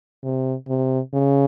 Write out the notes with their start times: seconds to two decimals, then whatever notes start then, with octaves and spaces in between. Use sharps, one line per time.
0.23 C3
0.68 C3
1.14 C#3